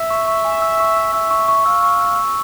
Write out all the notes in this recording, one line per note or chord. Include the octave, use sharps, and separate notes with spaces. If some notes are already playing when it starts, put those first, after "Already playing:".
Already playing: E5
C#6
C#6
G#5
E6
C#6
E6
E5 E6
C#6
C#6
F5 E6
C#6
E6
E6